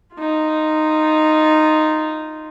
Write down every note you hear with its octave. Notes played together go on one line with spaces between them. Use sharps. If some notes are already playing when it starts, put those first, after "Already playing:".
D#4 F4